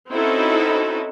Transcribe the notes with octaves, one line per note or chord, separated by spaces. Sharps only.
C4 C#4 D#4 E4 F#4 A4